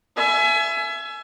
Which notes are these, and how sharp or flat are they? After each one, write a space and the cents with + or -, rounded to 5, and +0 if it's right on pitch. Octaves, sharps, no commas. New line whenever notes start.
E5 +25 G#5 +30